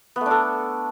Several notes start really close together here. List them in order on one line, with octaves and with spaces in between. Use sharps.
B3 A3 D4 A4